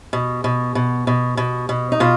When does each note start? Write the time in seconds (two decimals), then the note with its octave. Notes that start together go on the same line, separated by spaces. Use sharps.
0.13 B2
0.44 B2
0.75 B2
1.07 B2
1.37 B2
1.69 B2
1.92 D#4
2.00 B2 F4